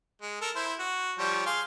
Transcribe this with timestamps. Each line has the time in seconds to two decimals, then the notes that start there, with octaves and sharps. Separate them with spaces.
0.22 G#3
0.41 A4 A#4
0.56 E4 C5
0.79 F#4
1.19 F3 G3 C#5
1.46 G#4 F5 C6